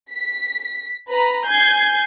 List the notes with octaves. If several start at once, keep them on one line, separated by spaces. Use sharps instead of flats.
B6
B4 A#5 B5
G#5 G6 G#6 C7